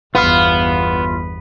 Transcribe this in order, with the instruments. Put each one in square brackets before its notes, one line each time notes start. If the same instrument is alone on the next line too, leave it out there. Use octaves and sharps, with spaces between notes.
[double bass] G1 E2 [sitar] B3 [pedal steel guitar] F4 F5